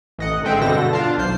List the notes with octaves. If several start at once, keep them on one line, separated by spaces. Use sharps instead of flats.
A1 D#5 F#5
D3 G#3 C4 E5 G5
G2 B2 D3 A4 A#6
D4 F4 F5 A5
B1 C5 C7